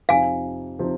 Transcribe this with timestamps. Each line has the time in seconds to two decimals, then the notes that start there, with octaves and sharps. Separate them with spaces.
0.09 F2 C3 F3 C4 D#4 F5 G#5
0.79 C3 F3 C4 D#4